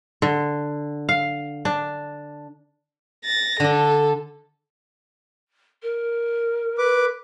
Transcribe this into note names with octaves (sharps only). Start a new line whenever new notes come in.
D3
F5
D4
A6 A#6
D3 D4 A4
A#4
B4 D6